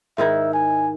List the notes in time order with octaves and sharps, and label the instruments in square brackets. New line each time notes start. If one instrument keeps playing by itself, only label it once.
[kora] G#2 D#3 E4 [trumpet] E5
[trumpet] G#5